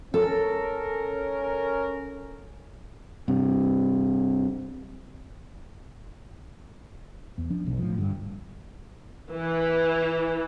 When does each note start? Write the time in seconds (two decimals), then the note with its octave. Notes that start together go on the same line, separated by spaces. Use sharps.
0.14 C#4 A4 A#4
3.28 G2 C3
7.38 E2
7.50 F3 D4
7.66 B1
7.79 A2 F3
7.98 G2 D3
9.31 E3